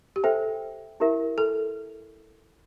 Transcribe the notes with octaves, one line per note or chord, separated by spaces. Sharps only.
G4
A4 C5 E5 G5
E4 G4 A#4 E5
A4